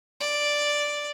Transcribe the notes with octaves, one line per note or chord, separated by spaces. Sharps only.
D5